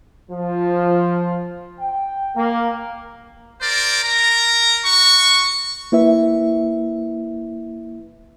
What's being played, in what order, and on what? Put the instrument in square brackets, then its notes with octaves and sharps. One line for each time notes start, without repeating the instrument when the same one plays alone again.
[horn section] F3
G5
A#3
[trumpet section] A#4 C5 D5
A#4 A#5
F#4 C#6
[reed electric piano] A#3 E4 B4 E5